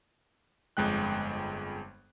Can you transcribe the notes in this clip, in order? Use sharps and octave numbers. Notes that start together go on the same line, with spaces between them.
G1 F2 G#3 G5 F#6